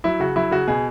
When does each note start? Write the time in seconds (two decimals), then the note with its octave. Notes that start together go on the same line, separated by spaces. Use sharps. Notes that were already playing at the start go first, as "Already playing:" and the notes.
0.04 F#3 E4
0.20 C#3 F#4
0.36 F#3 E4
0.51 C#3 F#4
0.68 B2 G#4